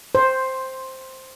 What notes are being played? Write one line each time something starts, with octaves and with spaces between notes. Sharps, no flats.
C5